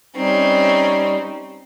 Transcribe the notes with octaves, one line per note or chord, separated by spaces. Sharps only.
G3 C4 C#4 D#4